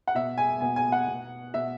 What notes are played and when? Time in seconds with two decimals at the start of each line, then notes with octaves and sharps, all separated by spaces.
0.07 F#5
0.15 B2 E5
0.38 G#5
0.61 B2 G#5
0.76 G#5
0.92 F#5
1.07 B2
1.54 B2 E5